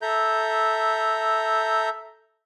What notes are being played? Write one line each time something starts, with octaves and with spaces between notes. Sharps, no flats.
A4 E5 A#5 G6